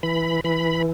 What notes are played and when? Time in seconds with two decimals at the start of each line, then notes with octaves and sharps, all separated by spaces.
0.03 E3 B5
0.44 E3 B5